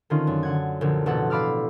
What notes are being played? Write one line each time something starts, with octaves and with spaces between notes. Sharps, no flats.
D3 D#3 C4 C#4 D#4 F4
F#2
D3 F#5 G#6
A#1 D3
A1 B2 A4 F#5
D5 F5 B5 D6 E6 F6